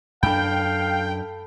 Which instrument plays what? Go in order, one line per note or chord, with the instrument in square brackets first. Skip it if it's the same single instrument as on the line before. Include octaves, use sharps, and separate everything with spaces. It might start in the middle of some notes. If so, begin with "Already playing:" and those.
[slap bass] F#2 D4 [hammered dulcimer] A4 B5 [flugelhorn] F5 [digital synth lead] G5